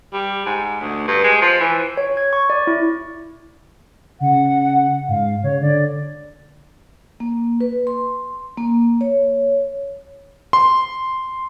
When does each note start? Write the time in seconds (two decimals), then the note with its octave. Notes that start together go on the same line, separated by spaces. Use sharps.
0.13 G3
0.46 G#2
0.81 D2
1.08 G2
1.24 G#3
1.41 F3
1.60 E3
1.97 C#5
2.17 G#6
2.33 C#6
2.50 D5
2.67 E4
4.20 C#3 F#5
5.08 G#2 F5
5.43 C#3 C#5
5.61 D3 D5
7.20 A#3
7.61 B4
7.87 C6
8.58 A#3
9.01 C#5
10.53 C6